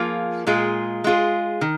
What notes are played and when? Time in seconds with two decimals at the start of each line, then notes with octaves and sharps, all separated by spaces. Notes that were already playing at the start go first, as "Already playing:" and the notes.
Already playing: F3 A#3 F4 G#4
0.47 A#2 G#3 F4 G#4
1.04 G#3 F4 G#4
1.61 D#3